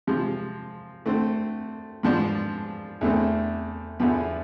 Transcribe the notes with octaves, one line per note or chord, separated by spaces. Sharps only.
C3 F3 G#3
D3 A3 C4
G#2 F3 B3 D4
E2 D3 A3 C4
E2 D3 F3 B3